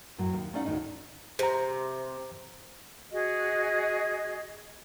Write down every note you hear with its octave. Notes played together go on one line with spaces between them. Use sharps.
F#2 A2 F#3
D#2
A3 C#4 D#4 D5 F5 F#5
D2 A2 D#3 D#4
C3 C5 A#5
F#4 G#4 D#5